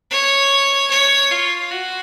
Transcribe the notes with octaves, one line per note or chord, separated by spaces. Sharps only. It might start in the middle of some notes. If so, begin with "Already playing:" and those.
C#5
C#5
F4
F#4